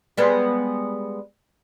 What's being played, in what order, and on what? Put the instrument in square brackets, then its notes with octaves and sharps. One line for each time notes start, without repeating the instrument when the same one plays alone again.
[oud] G3 G#3 B3